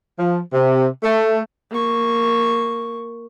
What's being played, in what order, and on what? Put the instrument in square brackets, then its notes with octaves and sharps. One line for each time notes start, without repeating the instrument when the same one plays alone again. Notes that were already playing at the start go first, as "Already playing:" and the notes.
[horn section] F3
C3
A3
[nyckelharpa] A#3 C#6